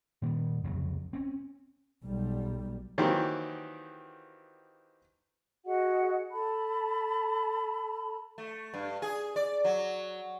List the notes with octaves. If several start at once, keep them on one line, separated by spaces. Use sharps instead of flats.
A#2 D#3 F#3 G3
C2 F2 C#3 F#3
C4 C#4
B1 G3
D#3 E3 F#3 A#3 C4 G4
F#4 G#4 D#5 F#5
A4 A5 B5
A3
G2
G#4
D5
F#3